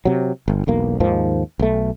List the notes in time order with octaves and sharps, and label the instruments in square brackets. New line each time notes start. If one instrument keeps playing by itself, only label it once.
[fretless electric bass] C3 F#3
G1
E1 B1 A#3
D#2 G#2 D#3 F3
B1 A3